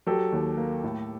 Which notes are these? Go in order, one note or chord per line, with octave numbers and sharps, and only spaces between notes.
F#3 G4 A4
D#2
A#3
A2